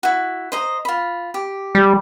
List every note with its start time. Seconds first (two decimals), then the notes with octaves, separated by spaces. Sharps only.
0.03 E4 F#4
0.52 C5 D#5 A#5
0.85 F4 B5
1.34 G4
1.75 G3